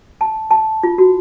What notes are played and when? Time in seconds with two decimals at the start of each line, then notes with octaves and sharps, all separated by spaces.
0.21 A5
0.51 A5
0.83 F4
0.98 F#4